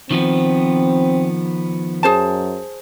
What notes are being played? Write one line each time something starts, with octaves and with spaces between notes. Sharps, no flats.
D#3 F3 B3 C4
F#2 G#4 C5 A5